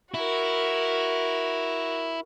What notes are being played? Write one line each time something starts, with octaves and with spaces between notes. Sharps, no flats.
E4 F#4 A#4